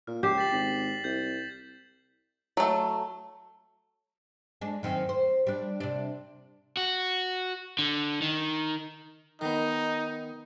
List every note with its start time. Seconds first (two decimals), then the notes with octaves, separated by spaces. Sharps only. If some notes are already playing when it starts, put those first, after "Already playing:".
0.07 A#2 F6
0.23 C#2 G4 F6 C7 E7
0.38 A6 B6 F#7
0.51 G#1 F#7
1.04 C2 G6
2.57 F#3 A3
4.61 G#3 D4
4.83 F#2 D#3 C4
5.09 C5
5.47 G3 D4
5.80 C3 D4
6.77 F#4
7.79 D3
8.22 D#3
9.41 D#3 B3 D#4